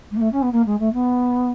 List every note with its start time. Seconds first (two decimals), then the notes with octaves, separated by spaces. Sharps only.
0.10 G#3
0.16 A#3
0.21 A3
0.32 C#4
0.42 B3
0.52 A#3
0.66 G#3
0.79 A3
0.93 B3